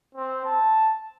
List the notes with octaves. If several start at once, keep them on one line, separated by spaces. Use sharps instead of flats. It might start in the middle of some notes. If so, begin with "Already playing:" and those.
C4
A5